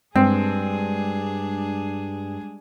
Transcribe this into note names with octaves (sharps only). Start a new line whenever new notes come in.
G2 G#3 C4 D4 G#4